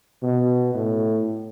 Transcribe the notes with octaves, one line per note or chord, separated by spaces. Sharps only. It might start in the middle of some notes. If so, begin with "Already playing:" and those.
B2
A2